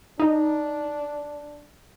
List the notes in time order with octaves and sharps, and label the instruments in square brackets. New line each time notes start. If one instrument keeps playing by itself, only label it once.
[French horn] D4 [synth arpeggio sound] D#4